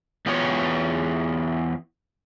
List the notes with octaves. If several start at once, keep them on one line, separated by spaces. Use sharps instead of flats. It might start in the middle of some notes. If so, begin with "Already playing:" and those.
E2 B3 F4 G4 C#5